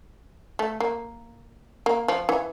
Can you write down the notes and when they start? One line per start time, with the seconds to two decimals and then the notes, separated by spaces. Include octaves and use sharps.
0.59 A3
0.80 A#3
1.86 A#3
2.08 F3
2.29 E3